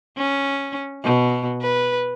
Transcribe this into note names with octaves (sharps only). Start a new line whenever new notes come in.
C#4
B2
B4